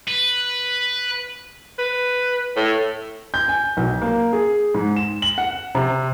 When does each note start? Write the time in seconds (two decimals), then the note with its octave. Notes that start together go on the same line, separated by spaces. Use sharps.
0.08 B4
1.79 B4
2.56 A2
3.34 G6
3.48 G#5
3.77 B1
4.02 A#3
4.33 G#4
4.74 G#2
4.96 E7
5.22 F#7
5.38 F#5
5.75 C3